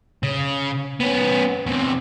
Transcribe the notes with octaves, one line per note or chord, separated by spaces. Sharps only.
C#3
B3 C#4
E2 C3